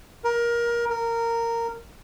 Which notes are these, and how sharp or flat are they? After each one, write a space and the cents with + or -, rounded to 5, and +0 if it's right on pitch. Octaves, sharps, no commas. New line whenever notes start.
A#4 +20
A#4 -15